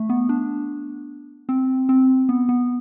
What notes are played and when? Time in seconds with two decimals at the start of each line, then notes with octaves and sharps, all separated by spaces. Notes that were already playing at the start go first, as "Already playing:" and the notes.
Already playing: A3
0.09 B3
0.29 D4
1.49 C4
1.89 C4
2.29 B3
2.49 B3